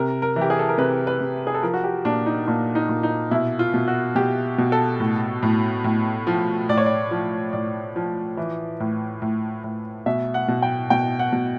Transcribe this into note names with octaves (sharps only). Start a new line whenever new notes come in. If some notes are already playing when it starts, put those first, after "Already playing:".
Already playing: C3 A#4
A#4
E3
G4
G#4
A4
A#4
C3 B4
B4
C3
G#4
A4
F3 A#4
F#4
G4
A#2 D4
D#4
A#2 D4
D#4
A#2
D#4
B2 E4
F4
B2
F#4
B2 G4
B2
A4
A2
A2
A2
F3
A2 D5
C#5
D5
F3
A2 D5
F3
E3
A2
A2
A2
B2 E5
F#5
B2
G5
B2 G5
F#5
B2